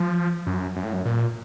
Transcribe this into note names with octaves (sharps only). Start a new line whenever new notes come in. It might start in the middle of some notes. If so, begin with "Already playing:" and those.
Already playing: F3
F#2
F#2
A2
F#2
A#2